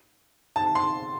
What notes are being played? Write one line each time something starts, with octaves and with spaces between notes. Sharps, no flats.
A5
C6